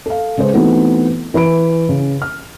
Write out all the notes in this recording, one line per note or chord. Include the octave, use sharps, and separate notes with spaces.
A4 F5
C#3 G#3 G#4 B4 C5
E3 A3 B3 C4 D#4 F#4
E3 B4 B5 D7
C#3
F6